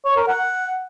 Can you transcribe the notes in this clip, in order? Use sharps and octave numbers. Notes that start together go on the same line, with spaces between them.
C#5
A#4
F#5